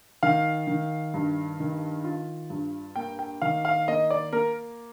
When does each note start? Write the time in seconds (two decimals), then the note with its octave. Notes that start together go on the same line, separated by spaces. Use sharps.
0.23 D#3 F5
0.67 D#3
1.14 G2
1.60 D#3
2.04 F4
2.50 G2
2.96 A#3 G5
3.19 G5
3.42 D#3 F5
3.65 F5
3.88 A#3 D#5
4.10 D5
4.33 A#3 A#4